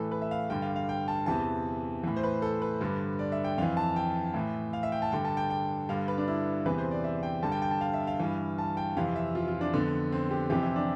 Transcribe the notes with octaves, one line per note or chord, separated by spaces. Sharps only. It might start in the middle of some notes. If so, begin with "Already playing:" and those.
Already playing: A2 E3 A4 B4
B4
E5
F5
G2 D3 G5
F5
F5
G5
A5
E2 C3 E3 A5
A2 E3
C5
B4
A4
B4
G2 D3
D5
E5
G5
F2 E3 F5
A5
G5
A2 E3
F5
E5
G5
A5
G2 D3 G5
A5
G5
G5
G2 D3 F5
B4
D4
E4
E2 C3 E3 B4
C5
D5
E5
G5
G2 D3 A5
G5
G5
A5
F5
E5
F5
G2 E3
A5
G5
F2 C3 E3 F5
E5
F4
F4
D4
F2 D3 B3
C4
G4
F2 C3 E3 G4
E4
D4